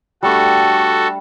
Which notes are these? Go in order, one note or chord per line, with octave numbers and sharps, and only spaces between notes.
G3 A3 D4 F#4 A4